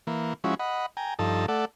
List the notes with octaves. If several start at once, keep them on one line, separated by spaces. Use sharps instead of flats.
E3 A#3
F3 G#3 C#4 E4 F#4
D#5 F#5 B5
G5 G#5 A#5
G2 F3 D#4 A4 A5
A3 A4 D5 F#5